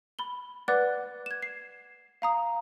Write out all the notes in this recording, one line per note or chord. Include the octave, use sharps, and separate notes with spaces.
B5 G7
B4 D5 F#5 D6 F#6 A6
G#6 E7
C7
F5 A#5 D#6